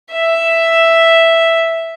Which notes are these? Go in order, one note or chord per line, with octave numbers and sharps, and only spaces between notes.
E5